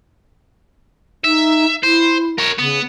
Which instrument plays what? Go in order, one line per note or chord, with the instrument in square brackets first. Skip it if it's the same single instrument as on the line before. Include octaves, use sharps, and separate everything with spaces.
[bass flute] D#4 [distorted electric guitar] E5
[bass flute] E4 [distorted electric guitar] C5
[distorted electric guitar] A#4 C#5
[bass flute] C#3 [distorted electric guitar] B3